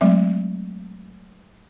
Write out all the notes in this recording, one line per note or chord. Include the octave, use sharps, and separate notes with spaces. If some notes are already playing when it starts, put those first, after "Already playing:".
F#3 G#3 A3 C4 E5